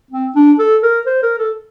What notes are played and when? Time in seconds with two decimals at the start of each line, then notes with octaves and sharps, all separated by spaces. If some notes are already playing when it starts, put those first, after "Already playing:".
0.10 C4
0.35 D4
0.59 A4
0.83 A#4
1.06 C5
1.22 A#4
1.38 A4